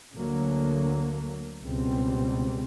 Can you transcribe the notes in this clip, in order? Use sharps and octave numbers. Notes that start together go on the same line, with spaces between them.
D2 D3 F#3 A#3
C#2 B2 G3 C4